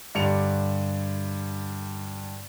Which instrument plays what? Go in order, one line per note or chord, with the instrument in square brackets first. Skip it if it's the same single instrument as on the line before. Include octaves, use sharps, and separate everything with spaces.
[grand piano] G2 D3 D5 C#7 F7